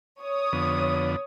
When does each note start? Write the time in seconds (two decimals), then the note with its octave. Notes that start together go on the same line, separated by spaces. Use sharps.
0.20 C#5 D#6
0.53 F2 D3 B3